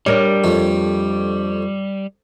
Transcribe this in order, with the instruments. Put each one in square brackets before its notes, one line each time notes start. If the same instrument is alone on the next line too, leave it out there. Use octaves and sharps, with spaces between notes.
[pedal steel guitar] G3 [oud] D4 A#4 C#5
[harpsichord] F2 A3